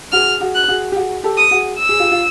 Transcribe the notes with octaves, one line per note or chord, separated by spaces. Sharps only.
F#4 G#4 F6
F#4 G#4
F#6
F#4 G#4
G4
F#4 G#4
G4 A4
D#6
F#4 G#4
E6
G#4
F4 G4
F4